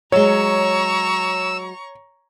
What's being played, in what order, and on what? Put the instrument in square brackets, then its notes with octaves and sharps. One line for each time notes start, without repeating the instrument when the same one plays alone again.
[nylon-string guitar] F#3 G#3 [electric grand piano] C#5 [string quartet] A#5 C#6 [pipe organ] E6